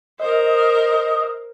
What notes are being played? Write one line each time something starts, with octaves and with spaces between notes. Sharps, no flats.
A#4 C5 D#5